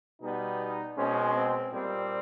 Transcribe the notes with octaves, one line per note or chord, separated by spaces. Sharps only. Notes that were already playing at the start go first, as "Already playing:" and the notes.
B2 G3 B3 D#4
B2 G#3 C4 C#4
C4
A#2 G3 C4